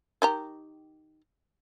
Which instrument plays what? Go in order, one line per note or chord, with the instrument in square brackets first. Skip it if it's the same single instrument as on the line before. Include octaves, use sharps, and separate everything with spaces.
[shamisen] D#3 G4 A#5